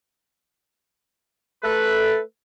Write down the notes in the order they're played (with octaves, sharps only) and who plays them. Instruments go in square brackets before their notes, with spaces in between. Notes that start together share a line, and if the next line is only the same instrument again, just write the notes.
[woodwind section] A3 A4 B4